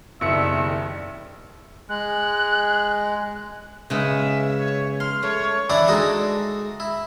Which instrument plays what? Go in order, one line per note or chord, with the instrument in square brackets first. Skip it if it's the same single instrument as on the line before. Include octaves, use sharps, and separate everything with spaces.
[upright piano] F#1 C#7 [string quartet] B2 D#3 G3 [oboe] E5
[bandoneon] G#3 [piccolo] F#6
[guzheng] C#3 G#3 B3 [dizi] E5
[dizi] C#5
[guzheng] C6 [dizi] F6
[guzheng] A3 [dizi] C#5
[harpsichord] E3 D4 E4 D5 F#5 D6
G#3 D#4 F#4 A4
E4